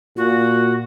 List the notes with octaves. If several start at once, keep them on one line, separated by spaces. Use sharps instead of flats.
A#2 F#4